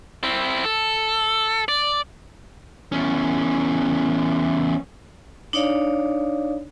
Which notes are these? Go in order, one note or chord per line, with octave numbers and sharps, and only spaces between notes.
C4 E4
A4
D5
E2 C#4
D4 D#4 C#5 D5 F5